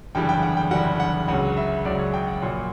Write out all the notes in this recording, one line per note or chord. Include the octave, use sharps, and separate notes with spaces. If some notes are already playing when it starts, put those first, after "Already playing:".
F#1 E2 D3 G3 G5
G5
F#5
G5
F#1 E2 D3 G3 F#5
F#5
C#2 C#3 F#3 F#5
E5
C#2 C#3 F#3 D5
C#5
G5
F#5
A#1 A#2 F#3 F#5